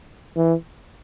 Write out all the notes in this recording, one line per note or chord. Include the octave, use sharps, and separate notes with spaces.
E3